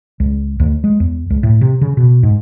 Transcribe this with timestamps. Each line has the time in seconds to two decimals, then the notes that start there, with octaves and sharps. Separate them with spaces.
0.20 C#2
0.60 D2
0.84 G#3
1.00 E2
1.30 C#2
1.43 A2
1.61 C3
1.81 C#3
1.97 B2
2.23 G#2